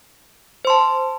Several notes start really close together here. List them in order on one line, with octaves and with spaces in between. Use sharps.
C5 C6 A5